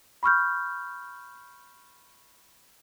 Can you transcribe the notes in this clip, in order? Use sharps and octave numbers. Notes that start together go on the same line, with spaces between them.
B5 C#6 F6 G6